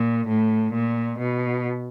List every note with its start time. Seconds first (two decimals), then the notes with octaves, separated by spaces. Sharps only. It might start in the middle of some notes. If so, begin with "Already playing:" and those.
Already playing: A#2
0.28 A2
0.74 A#2
1.18 B2